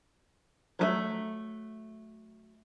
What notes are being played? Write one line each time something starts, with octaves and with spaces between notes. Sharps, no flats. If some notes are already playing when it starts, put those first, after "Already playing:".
F#3 G3 A3